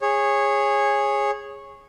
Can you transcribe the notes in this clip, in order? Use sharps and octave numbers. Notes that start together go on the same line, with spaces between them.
G#4 C#5